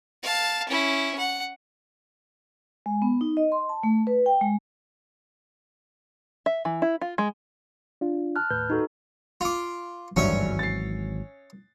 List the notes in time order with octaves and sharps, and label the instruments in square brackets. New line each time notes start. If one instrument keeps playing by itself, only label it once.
[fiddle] F5 A5
C#4 E4
F#5
[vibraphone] G#3
B3
D#4
D#5
C6
A5
A3
B4
G5
G#3
[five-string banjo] E5
E3
E4
F4
G#3
[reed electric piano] D4 F4
[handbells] A5 F6 F#6
[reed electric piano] D#2 A2 G6 [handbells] B4
[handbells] D#4 F#4 A4
[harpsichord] F4 D6
[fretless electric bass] G#1 E3 F#3 [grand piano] D2 G2 [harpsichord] C#4 E5
[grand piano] A6 C7